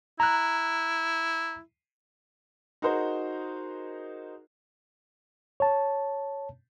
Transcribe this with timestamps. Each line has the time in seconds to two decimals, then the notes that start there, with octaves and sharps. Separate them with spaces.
0.20 E4 A#5 F#6
2.82 D#4 F#4 G#4 A#4 C5
5.60 C#5 A5